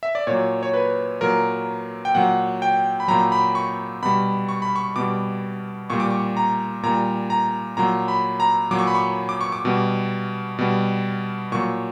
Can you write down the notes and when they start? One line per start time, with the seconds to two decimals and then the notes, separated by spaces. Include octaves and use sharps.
0.03 E5
0.15 D5
0.27 A#2 F#3 C#5
0.63 C#5
0.74 B4
1.21 A#2 F#3 A#4
2.05 G5
2.15 A#2 F#3 F#5
2.62 G5
3.00 B5
3.08 A#2 F#3 A#5
3.32 B5
3.55 C#6
4.03 B2 G3 B5
4.49 C#6
4.62 B5
4.76 C#6
4.96 B2 G3 D6
5.90 A#2 G3 C#6
6.00 D6
6.11 C#6
6.37 A#5
6.83 A#2 G3 A#5
7.30 A#5
7.77 A#2 F#3 A#5
8.08 B5
8.40 A#5
8.71 A#2 F#3 D6
8.79 C#6
8.87 B5
8.95 C#6
9.29 D6
9.41 C#6
9.52 D6
9.65 B2 G3
10.59 B2 G3
11.52 A#2 F#3 C#6